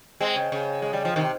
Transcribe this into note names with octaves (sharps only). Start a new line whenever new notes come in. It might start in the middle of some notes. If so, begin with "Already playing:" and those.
G#3 C4
C#3
C#3
G#3
G3
F3
C3 D#3